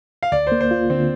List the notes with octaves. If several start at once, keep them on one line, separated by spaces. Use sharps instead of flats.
F5
D2 D5
C5
A#3
C5
F4
D3 C4